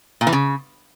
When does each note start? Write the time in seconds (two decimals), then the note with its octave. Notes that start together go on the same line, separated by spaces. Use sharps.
0.21 A#2
0.27 E3
0.33 C#3